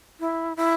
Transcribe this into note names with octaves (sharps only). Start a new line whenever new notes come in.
E4
E4